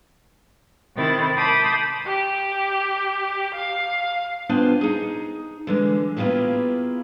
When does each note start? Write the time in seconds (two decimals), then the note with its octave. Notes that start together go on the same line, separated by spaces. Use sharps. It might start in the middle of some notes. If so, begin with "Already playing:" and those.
0.95 C3 D#3 E4 A6
1.36 A5 B5 C6 D6 D#6 G6
2.06 G4
3.54 F5
4.49 B3 D4 F4 C5 G5 G#5
4.81 D#4 G#4
5.67 D3 E3 G#3
6.16 A#3 B3 E4 F4 G4 G#4